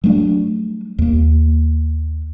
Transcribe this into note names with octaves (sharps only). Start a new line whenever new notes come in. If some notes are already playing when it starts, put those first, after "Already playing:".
F#3 G3 A3 D4
D#2 A#3